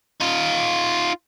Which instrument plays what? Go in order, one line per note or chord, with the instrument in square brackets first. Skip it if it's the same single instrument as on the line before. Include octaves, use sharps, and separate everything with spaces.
[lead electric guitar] D#4 F4